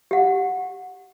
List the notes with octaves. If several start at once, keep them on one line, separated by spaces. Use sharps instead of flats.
G4 F#5